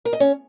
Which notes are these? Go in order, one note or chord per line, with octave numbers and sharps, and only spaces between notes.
A#4
D#5
C#4